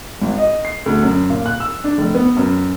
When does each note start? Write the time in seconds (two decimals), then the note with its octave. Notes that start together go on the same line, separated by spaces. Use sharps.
0.22 G#1
0.38 D#5
0.65 C7
0.86 D2
1.03 F#2
1.30 A#2
1.46 F#6
1.60 E6
1.84 D4
1.98 F1
2.15 B3
2.37 F#2